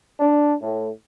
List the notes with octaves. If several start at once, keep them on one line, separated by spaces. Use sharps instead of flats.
D4
A2